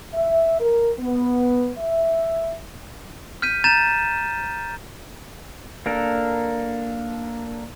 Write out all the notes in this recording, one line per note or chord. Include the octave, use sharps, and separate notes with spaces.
E5
A#4
B3
E5
F6 G6 B6 D#7
A#5 G6 A6 D#7 E7
A#3 D4 A4 A#4